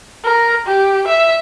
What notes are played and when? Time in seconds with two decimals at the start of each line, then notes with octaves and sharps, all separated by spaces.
0.25 A#4
0.66 G4
1.08 E5